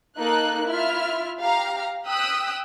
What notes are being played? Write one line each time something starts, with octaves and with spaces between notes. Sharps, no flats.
A#3 D#4 A4 A#4 F#6
E4 F4 E5 F6
G4 F5 A#5
G5 D#6 E6 F#6 B6